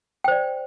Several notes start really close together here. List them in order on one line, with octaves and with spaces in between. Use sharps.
G5 C5 D5